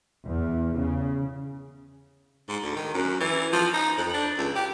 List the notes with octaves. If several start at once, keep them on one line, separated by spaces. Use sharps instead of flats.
E2
C#3
G#2
D2
D#3
F#2
E3
F3
D#4
F2
D4
C#2
G4